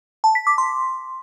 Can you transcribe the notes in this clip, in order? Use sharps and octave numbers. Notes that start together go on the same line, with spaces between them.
A5
B6
D6
C6